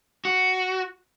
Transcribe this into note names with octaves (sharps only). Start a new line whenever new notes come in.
F#4